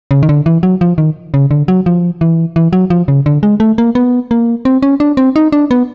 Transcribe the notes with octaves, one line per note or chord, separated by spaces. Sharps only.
C#3
D#3
D3
E3
F#3
F3
D#3
C#3
D3
F#3
F3
E3
E3
F#3
F3
C#3
D3
G#3
A3
A#3
B3
A#3
C4
C#4
D4
C4
D#4
D4
B3